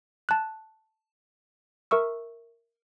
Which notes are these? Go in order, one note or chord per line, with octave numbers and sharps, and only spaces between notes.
A5 F#6
A#4 E5 C#6 E6